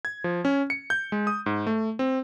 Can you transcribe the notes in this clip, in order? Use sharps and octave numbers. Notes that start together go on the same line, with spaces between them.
G#6
F3
C#4
C#7
G6
G#3
D#6
G#2
A3
C4